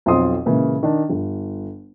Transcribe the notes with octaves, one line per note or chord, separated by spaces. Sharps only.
B1 F2 C4 F4 C6 D#6
A#2 C#3 E3 G#3 A#3
D#3 D4
G1